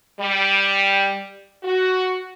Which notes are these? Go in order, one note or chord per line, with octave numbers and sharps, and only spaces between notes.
G3
F#4